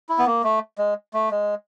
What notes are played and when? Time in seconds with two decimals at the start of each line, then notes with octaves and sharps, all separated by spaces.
0.09 E4
0.19 B3
0.26 A#3
0.44 A3
0.78 G#3
1.14 A3
1.31 G#3